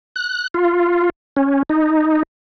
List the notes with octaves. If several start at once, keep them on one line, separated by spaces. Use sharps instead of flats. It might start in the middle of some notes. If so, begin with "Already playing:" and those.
F#6
F4
C#4
D#4